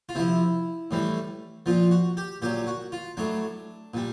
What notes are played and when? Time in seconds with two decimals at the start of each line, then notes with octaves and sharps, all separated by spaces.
0.09 F4
0.15 C3 F3 E4
0.91 A2 E3 G3
1.66 A#2 F3 F4
1.91 F#4
2.17 G4
2.42 A#2 F#3 G4
2.67 F#4
2.92 F4
3.17 A2 F#3 D4
3.94 A#2 G3